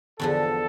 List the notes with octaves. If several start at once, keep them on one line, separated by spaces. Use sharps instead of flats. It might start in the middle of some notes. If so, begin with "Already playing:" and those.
E2 D3 F3 A4